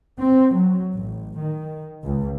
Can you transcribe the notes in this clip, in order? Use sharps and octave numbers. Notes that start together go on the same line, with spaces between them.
C4
F#3
A1
D#3
C#2